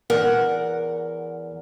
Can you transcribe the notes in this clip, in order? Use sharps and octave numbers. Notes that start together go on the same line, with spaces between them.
E2 A#4 F#5